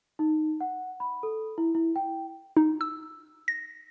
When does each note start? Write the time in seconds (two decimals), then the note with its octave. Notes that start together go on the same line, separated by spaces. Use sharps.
0.19 D#4
0.61 F#5
1.00 B5
1.23 A4
1.58 E4
1.75 E4
1.96 G5
2.57 D#4
2.81 E6
3.48 A#6